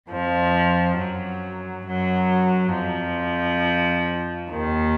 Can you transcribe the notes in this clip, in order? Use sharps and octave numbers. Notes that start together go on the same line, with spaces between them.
F2 F3
F#2 F#3
F#2 F#3
F2 F3
D#2 D#3